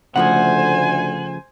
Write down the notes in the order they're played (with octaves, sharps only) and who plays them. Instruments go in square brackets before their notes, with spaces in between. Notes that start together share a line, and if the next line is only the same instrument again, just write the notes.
[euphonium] D2 [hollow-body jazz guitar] C#3 F3 A3 [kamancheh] C5 G#5 [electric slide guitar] F#5